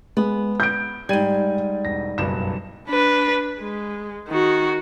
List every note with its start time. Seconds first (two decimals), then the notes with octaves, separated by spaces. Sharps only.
0.17 G#3 B3
0.60 G6 D7
1.09 G#2 G3 G#6 D#7
1.85 E1 A#6
2.18 F#1 B1 G2 E7
2.87 D4 B4
3.59 G#3
4.28 D#3 F#4